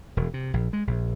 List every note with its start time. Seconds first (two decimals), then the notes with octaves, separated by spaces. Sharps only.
0.17 E1
0.34 C3
0.54 A#1
0.73 G#3
0.87 A#1